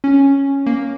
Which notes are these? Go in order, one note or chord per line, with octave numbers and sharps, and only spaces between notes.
C#4
A#3